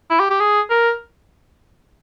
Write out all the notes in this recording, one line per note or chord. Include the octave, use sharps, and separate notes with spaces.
E4
G4
G4
G#4
A#4